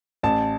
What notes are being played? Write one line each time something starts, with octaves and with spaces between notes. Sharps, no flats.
A1 A5